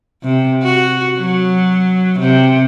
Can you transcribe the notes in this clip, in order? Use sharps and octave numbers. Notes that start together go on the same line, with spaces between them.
C3
F#4
F#3
C3